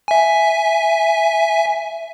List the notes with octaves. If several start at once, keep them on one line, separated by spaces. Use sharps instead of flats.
E5 G#5